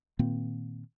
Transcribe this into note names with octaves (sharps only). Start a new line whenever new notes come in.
A#2 D#3 A#3 C4